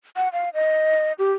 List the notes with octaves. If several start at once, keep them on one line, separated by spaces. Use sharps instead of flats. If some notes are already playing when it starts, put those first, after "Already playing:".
F#5
F5
D#5
G4